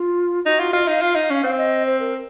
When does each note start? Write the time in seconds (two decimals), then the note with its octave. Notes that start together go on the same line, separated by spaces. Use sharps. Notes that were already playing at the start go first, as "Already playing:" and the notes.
Already playing: F4
0.46 D#4 F#4
0.60 F4
0.73 F4 D#5
0.87 D#4 F5
1.02 F4
1.15 D#4
1.30 C#4
1.44 C4
1.58 D#5
1.86 C5
2.00 A#4